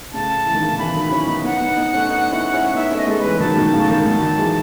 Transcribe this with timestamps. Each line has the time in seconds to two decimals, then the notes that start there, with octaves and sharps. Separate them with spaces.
0.13 A2 C#3 A5
0.46 E3
0.54 D#3
0.62 C#3
0.69 B2 D#3
0.78 C#3 E3 B5
0.94 D#3 F#3
1.11 C#4 E4
1.28 B3 D#4
1.44 B3 D#4 F#5
1.60 B3 D#4
1.77 B3 D#4
1.93 A3 C#4
2.09 B3 D#4
2.31 C#4 E4
2.53 C#4 E4
2.74 B3 D#4 E5
2.91 A3 C#4
2.97 D#5
3.07 G#3 B3 A4
3.18 B4
3.24 E3 G#3
3.40 D#3 F#3 A5
3.57 B2 D#3
3.73 A2 C#3
3.90 B2 D#3
4.05 D#3 F#3 A5
4.22 D#3 F#3
4.38 E3 G#3